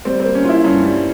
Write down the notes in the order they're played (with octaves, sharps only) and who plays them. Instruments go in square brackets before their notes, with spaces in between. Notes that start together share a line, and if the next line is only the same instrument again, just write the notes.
[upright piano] G3 [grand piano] C4
[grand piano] C4
[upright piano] A#3
[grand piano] C#4
[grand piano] E4 [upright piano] F4
[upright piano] G2 [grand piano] C#4
[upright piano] G3